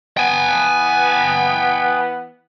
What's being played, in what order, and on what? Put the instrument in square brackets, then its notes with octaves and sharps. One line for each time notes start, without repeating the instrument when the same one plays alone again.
[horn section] E3 B3 [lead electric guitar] G5 G#5